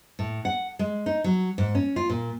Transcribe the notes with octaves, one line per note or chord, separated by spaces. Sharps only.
A2
F#5
G#3
D#4
F#3
G#2
C#4
F4
A#2